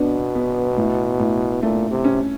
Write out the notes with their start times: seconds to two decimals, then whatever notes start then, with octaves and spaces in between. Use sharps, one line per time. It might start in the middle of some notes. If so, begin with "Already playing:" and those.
Already playing: B2 B3 D4
0.35 B3
0.77 A2
1.20 A2
1.62 A#2 A3
1.90 C3
2.04 C#4